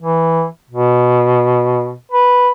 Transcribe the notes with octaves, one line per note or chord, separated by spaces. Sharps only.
E3
B2
B4